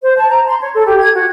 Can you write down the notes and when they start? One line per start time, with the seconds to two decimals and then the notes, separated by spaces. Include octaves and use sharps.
0.02 C5
0.16 A5
0.29 A#5
0.47 C6
0.60 C#5
0.73 A4
0.86 G4
0.99 G#6
1.14 F#4